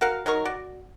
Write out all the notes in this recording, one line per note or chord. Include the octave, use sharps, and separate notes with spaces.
F#4 A#4 F5 F#5
F#3 D#4 A#4 C#6
F#4 D5